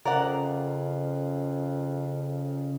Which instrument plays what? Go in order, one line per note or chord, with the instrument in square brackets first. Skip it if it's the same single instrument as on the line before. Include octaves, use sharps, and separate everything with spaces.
[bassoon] F2 [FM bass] C#3 [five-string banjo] A#4 D5 F#5